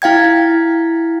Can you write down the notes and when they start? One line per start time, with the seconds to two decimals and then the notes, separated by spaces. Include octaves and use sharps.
0.02 E4 F5 G5 G#6